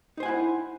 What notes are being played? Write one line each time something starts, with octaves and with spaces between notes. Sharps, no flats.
D#4 E4 C5 F#5 G#5